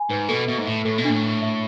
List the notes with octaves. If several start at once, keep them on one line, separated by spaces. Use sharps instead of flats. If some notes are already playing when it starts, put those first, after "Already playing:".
Already playing: G#5 B5
G#2 B4
B2 A4
B2 E5
G#2
A2 E5
A2 A4
B2
A2 D4
D4
E5